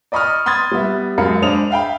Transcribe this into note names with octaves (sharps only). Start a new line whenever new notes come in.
D5 D#5 B5 C#6 D#6 F6
B5 C6 D#6 G#6 A6
G3 B3 E5
F#2 G#3 A#4 F5 B5 C#7
G#3 D4 C5 D#6 F7
E5 F5 G5 B5